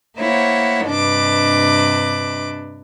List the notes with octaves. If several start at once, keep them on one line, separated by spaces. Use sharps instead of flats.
A#3 E4 C5 C#5 F#5
G2 C3 D4 B4 D#5 D6